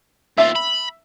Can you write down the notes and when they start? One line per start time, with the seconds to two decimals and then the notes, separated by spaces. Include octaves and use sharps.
0.38 D#2 F4 E5
0.56 B5